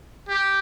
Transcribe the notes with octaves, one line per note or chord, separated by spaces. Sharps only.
G4